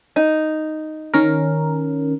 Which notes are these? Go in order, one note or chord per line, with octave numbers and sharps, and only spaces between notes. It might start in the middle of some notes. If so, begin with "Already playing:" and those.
D#4
D#3 C#4 A#4